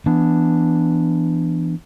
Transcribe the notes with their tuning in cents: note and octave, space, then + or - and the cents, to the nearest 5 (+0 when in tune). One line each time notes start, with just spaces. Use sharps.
E3 +15 B3 +0 D4 +5